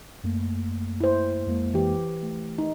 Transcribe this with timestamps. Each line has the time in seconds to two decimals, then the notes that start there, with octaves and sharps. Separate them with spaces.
0.24 F#2 A3 A#3
1.00 E4 C5
1.47 F2 G#3 A#3
1.74 E3 G4
2.23 A3
2.58 D#4